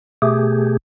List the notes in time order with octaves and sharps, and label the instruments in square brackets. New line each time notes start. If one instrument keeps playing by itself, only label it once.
[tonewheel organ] B2 A3 G4 G#4